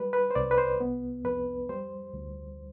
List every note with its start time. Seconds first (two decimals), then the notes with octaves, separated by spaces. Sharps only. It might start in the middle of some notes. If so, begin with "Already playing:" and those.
Already playing: G3 B4
0.13 B4
0.31 C5
0.35 C2 D5
0.51 B4
0.58 C5
0.80 B3
1.24 F2 B4
1.69 G3 C5
2.14 D2